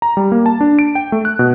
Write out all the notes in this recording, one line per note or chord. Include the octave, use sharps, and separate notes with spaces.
A#5
G3
A#3
A5
D4
D7
G5
A3
F#6
B2